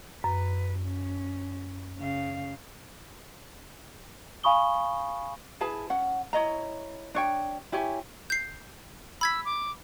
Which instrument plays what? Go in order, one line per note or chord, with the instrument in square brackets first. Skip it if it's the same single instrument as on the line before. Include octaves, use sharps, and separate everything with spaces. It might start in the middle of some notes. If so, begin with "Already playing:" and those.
[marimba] F#2 [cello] B4
[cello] C#4
C#3 F5
[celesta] F5 G#5 B5 C#6 D#6 G7
[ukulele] E4 G#4 B4 A5
C#4 F#5
E4 C#5 D#5 A#5
D4 C#5 G5
E4 G4 C#5 G#5
[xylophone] G6 C7
[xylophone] B5 G#6 B6 [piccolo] E6
[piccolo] D6